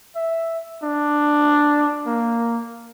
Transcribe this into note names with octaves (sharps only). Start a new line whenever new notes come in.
E5
D4
A#3